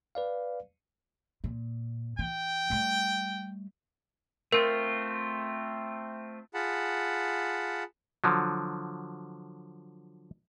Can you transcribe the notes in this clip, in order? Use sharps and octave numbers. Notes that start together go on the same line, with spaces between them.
B4 D5 F5
A#2
E3 G5
G3 A3
A3 C4 F4 A#4
F4 G#4 F#5 A5 B5
D3 F3 F#3